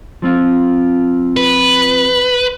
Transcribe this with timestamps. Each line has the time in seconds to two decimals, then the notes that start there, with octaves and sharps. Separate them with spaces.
0.22 F3 C4 F4
1.37 B4